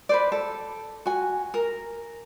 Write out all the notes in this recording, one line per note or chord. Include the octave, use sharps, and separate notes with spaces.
B4 C5 D5
A4
F#4 G#5
A#4